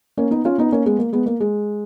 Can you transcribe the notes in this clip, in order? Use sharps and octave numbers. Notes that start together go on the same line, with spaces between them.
A#3 C#4
B3 D#4
C#4 F4
B3 D#4
A#3 C#4
G#3 B3
A#3
G#3 B3
A#3
G#3